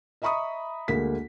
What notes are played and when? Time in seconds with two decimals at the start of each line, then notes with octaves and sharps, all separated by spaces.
0.22 D#5 E5 A#5 B5 C#6 D#6
0.88 D2 G#3 A#3 B6